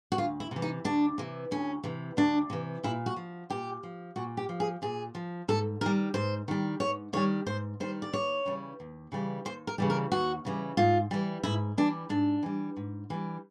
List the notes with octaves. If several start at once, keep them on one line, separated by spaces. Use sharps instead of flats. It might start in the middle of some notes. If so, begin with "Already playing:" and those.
F#4
D2 F4
E4
C3 E3
D#4
D2 D4
C3 E3
D2 C#4
C3 E3
D2 D4
C3 E3
A#2 E4
F#4
F3
A#2 G4
F3
A#2 F#4
G4
F3
G#4
A#2 G#4
F3
G#2 A4
D#3 G3 A#4
G#2 C5
D#3 G3
G#2 C#5
D#3 G3 C#5
G#2 C5
D#3 G3 C5
D5
D#2 C#5
C#3 E3 G3
D#2
C#3 E3 G3
D#2 C5
A#4
C#3 E3 G3
A#4
D#2 F#4
C#3 E3 G3
G#2 F4
E3 G3
G#2 E4
E3 G3 D4
G#2 D4
E3 G3
G#2
E3 G3